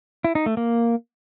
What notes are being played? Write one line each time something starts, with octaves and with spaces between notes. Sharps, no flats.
E4
D#4
A3
A#3